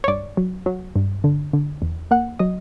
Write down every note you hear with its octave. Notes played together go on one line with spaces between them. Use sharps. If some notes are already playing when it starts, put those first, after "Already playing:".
C#5
G2 D5
F#3
F#3
G2
D3
D3
E2
A#3 F#5
F#3 D#5